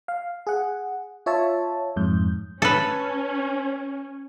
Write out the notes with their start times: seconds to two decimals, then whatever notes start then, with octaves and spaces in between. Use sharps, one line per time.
0.08 F5
0.47 G#4 F#5
1.26 F4 C#5 E5 A5
1.96 F2 G#2 G6
2.62 C#4 A4 B4